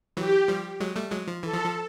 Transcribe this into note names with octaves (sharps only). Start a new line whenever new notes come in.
E3 F#3 G4
F3 G3
F#3 G#3
G3 A3
F#3 G#3
F3
E3 A4
F3
F3